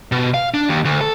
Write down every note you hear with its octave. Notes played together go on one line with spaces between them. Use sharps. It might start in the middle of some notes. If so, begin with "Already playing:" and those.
B2
F5
D4
D#2
D2
A4